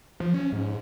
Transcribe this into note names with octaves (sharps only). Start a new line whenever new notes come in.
F3
C#4
G#2